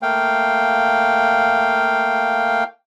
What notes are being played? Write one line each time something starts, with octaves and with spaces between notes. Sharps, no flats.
A3 A#3 F5 G5